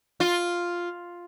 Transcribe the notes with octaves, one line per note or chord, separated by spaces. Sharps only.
F4